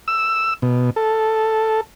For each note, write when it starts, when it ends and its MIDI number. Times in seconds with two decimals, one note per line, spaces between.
0.08 0.54 88
0.62 0.90 47
0.96 1.81 69